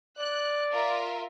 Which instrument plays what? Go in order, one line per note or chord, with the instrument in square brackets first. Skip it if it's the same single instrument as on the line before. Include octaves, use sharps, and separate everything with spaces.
[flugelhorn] D5 [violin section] F#6
[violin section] F4 A#4 E5